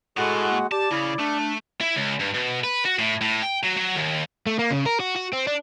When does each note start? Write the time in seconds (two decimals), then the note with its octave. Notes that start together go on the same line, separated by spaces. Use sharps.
0.17 A2 G#3 F#4 A4 F#5
0.50 A#3
0.72 G4 D5 A5
0.91 C#3 E4
1.20 A3 D4
1.81 E4
1.97 C#2
2.20 G2
2.34 B2
2.64 B4
2.85 F#4
2.99 A2
3.21 A2
3.43 G5
3.63 F#3
3.77 F#3
3.96 D#2
4.46 A3
4.59 A#3
4.71 C#3
4.86 A#4
5.00 F#4
5.16 F#4
5.33 C4
5.47 D4